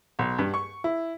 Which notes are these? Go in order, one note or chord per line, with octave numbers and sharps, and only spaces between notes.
B1
G2
C#6
E4